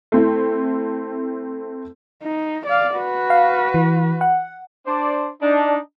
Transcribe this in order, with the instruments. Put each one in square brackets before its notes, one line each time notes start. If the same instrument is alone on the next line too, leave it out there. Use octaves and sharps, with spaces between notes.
[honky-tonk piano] A3 C4 E4
[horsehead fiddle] D#4
D5 F5
F#4 B4
[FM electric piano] F5
E3
F#5
[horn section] D4 C5 D5
D4 D#4